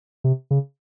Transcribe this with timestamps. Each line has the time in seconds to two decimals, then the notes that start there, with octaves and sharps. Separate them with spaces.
0.24 C3
0.51 C#3